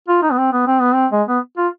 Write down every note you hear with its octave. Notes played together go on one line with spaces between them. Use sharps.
F4
D#4
B3
C4
B3
C4
B3
C4
G#3
B3
F4